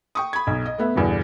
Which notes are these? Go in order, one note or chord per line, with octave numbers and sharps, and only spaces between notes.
G5 C#6 D#6
B5 G#6
B1
D#5
A3 B3 E5
E2 G2 B2 D3